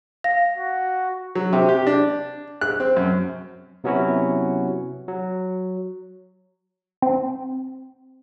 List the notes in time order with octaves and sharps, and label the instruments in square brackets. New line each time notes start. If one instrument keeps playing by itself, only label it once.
[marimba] F5 [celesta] A#6
[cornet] F#4
[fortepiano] F#3
C3
G4
D4
F#6
C4
F#2
[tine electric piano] C3 F#3 B3 C#4 E4 F#4
F#3
[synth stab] C4